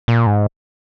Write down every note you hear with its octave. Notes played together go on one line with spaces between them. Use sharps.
A#2
G#2